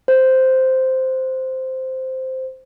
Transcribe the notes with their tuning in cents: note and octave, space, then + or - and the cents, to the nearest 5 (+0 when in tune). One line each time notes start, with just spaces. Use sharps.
C5 -5